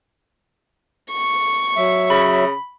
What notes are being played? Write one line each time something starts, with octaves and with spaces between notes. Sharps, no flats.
C#6
F#3 E5
C#3 B5